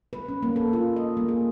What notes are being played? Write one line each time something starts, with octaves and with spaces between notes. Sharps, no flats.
B4
C#4
A#3
A4
F4
D#5
A#3
G#4